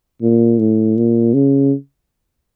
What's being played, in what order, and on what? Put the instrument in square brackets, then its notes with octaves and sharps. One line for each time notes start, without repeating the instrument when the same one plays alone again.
[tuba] A#2
A2
A#2
C#3